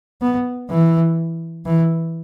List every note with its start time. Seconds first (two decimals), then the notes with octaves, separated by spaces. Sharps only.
0.21 B3
0.70 E3
1.66 E3